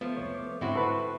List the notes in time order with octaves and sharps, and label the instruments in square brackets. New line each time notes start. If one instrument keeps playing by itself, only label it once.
[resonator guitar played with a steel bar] F3 [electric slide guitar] A3 B3
[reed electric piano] C2 F2 C#5
D6
[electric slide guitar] G#2 D3 [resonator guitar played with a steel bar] C4 E4 F#4
[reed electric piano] A4 B4 [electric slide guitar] C5